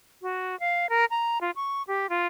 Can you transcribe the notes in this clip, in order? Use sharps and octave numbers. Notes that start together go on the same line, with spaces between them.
F#4
F5
A#4
A#5
F4
C#6
G4
F4